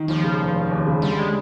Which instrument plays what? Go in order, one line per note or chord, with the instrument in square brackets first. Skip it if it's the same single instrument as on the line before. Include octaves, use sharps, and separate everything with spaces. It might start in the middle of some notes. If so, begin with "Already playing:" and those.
Already playing: [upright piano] D#3
[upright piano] D#2 [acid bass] F3
[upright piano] C#3
F1
F1
D#2
C#3
[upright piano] D3 [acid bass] G3
[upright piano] G3 [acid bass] G#3